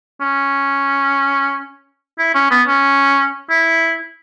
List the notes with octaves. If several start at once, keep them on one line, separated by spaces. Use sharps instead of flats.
C#4
E4
C#4
B3
C#4
E4